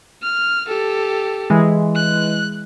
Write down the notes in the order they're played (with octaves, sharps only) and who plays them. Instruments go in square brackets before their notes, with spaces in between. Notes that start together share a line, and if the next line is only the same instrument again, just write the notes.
[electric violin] F6
G4 A4
[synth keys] E3 G#3
[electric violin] F#6